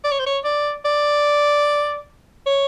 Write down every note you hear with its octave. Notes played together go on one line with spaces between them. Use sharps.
D5
C#5
C5
C#5
D5
D5
C#5